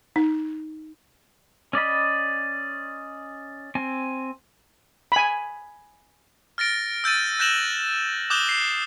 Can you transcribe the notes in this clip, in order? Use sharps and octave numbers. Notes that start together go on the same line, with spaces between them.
D#4
C#4 D5 D#5 B5
C4 G#5
G#5 B5
F6 A6 A#6 D7
E6 G6 A6 D#7
F#6 G6 A#6 E7 F#7
D6 D#6 F#6 G6 E7 G7
C7